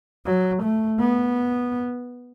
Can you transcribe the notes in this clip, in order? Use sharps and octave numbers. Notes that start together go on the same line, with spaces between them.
F#3
A3
B3